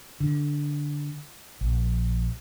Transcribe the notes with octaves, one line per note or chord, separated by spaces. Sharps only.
D3
A#1